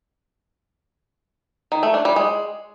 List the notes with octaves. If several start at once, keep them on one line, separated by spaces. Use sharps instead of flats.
D#3
A3
D4
G3
G#3